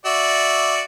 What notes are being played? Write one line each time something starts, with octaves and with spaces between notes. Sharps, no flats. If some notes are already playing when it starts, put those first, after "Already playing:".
F#4 D5 E5